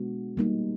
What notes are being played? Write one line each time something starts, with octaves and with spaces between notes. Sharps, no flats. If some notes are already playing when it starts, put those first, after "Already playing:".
Already playing: B2 G#3 B3 D4 F#4
G3 A#3 D#4